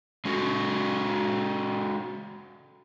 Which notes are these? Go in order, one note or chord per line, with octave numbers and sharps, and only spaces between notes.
G#3 C#4 F#4 A4